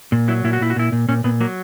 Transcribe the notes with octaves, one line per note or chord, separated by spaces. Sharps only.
A#2
F#3 E4
A#2 E4
F#4
A#2 E4
F#4
A#2 E4
A#2
A#2 C#4
A#2 B3
F#3 A#3